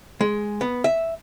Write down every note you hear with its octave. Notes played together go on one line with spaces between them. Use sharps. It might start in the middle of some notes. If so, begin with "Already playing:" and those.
G#3
B3
E5